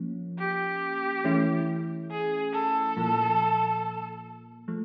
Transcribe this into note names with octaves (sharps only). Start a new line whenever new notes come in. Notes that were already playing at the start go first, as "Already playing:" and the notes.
Already playing: F3 A#3 C#4
G4
E3 A3 C#4 E4
G#4
A4
A#2 F3 A#3
F3 A3